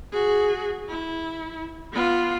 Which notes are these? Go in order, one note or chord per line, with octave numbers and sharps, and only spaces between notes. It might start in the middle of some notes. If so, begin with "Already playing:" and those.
F#4 G#4
E4
B3 F4